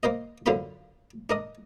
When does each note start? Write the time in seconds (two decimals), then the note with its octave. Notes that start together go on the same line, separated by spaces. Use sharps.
0.03 A#3 A#4 C5 D#5
0.46 F#2 D3 F4 C5 B5 C6
1.30 D4 A#4 D#5